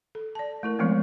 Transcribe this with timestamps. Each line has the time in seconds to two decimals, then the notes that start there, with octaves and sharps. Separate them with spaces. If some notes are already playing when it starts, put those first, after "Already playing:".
0.15 A4
0.35 D5 A5
0.63 A3 E4 A#4
0.79 E3 F3 G#3 A3 B3 C4